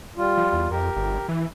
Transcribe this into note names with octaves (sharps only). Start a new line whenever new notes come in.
G3 F4
F3
E2
F2 G4 A#4
G1
E3